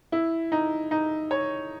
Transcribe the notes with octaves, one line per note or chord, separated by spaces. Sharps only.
E4
D#4
D#4
C#5